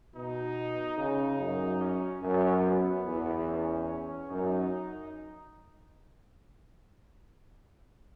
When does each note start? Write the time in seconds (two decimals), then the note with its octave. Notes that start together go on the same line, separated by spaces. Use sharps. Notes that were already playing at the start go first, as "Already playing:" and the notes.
0.15 B2 D#4
0.97 C#3 D#4
1.39 F#2
1.81 C#4
2.22 F#2
2.64 B3
3.06 E2
3.48 C#4
4.30 F#2 D#4